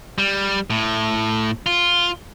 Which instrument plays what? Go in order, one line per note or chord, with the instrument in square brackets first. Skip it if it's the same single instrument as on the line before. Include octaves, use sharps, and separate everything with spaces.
[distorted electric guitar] G3
A2
F4